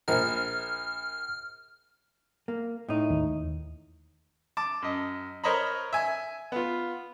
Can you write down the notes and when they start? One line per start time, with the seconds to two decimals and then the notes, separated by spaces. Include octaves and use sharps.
0.08 A#1 C5 A#5 F6
2.48 A#3
2.89 A2 D#4
3.10 D#2
4.57 A5 D6
4.82 F#2 D#5
5.44 A#4 C5 C#5 D#5 A#5 B5
5.93 E5 G#5
6.52 B3 F4